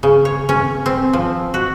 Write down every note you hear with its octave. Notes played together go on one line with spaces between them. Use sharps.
C#3
C#5
C#4
C4
F3
F#4